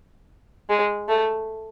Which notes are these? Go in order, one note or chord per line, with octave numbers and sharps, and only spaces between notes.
G#3
A3